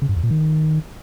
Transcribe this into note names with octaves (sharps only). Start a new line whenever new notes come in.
C#3
G2
E2
A#2
D#3